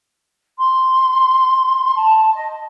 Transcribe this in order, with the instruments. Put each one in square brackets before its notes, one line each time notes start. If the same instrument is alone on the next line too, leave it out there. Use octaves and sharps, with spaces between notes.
[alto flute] C6
A5
D#5